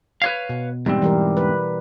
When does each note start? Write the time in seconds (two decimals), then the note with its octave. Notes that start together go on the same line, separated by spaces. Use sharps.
0.22 B4 C#5 F5
0.49 B2
0.86 E2 G#2 G3 C4
1.02 E3 G3 A#4
1.37 B4